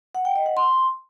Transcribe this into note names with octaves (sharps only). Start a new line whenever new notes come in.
F#5
G5
D#5
F#5
C6